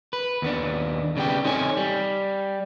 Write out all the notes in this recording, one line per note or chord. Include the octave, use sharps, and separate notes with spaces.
B4
D#2 B3 D4
C#3 G3 B3 G5
C4 D#4 A4 C#5 G#5
G3